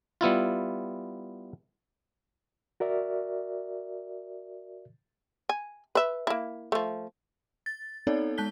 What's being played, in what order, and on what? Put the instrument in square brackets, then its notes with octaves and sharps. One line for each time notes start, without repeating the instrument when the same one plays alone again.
[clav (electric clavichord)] G3 B3 E4 F4
[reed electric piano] F#4 A#4 D5 E5
[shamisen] G#5
B4 E5
A#3 E4
F3 A3
[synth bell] A6
B3 C4 D#4 A4 C#5 D5
G#3 A5 F#6 G6 B6 G7